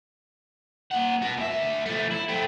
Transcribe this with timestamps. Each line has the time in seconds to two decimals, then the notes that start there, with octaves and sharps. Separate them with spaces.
0.92 A#3 F#5
1.22 F#4 B4
1.37 D2 E5
1.86 F3 A3
2.11 E4
2.29 A3 C4